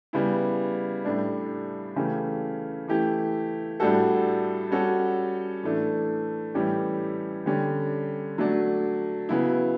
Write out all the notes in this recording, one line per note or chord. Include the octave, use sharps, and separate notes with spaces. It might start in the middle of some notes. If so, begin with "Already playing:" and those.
C#3 G3 B3 E4
A2 G3 D4
C#3 E3 A3 C#4 G4
E3 A3 E4 G4
A2 G3 D4 F#4 A4
G3 C#4 F#4 A4
A2 E3 A3 D4
A2 E3 G3 C#4 G4
D3 G3 C#4 G4
F#3 A3 D4
C#3 F#3 B3 E4